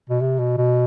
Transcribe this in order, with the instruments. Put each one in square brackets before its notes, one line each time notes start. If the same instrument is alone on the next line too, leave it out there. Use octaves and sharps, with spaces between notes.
[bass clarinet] B2
C3
B2
B2